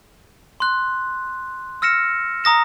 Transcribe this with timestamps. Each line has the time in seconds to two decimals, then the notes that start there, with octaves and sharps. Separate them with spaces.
0.60 C6 F#6
1.82 E6 F6 A#6 C#7 E7
2.44 A#5 D#6 A#6 E7